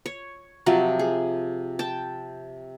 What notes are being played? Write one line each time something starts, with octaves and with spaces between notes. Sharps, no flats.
C#5
C3 F3 F#3
G#4
G5 A5